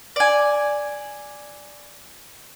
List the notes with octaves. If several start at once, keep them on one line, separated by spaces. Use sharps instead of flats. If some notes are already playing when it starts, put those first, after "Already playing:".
D5 G#5